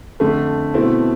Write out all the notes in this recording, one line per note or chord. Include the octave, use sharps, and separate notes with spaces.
F2 D3 A3
B2 A3 C4 E4